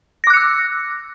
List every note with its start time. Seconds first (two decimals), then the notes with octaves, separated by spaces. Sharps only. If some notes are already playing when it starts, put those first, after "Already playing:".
0.24 A#6
0.27 D6
0.30 F#6
0.34 C#7
0.37 E6